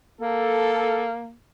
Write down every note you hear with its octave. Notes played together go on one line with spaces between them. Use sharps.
A#3 A4